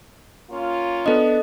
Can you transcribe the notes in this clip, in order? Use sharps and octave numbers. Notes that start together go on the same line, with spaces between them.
A#3 C#4 F4
B3 D4 A4 D#5